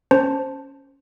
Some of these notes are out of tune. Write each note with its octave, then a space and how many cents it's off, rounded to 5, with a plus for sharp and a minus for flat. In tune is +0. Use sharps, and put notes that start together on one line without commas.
C#4 +0 C5 +0 A5 +0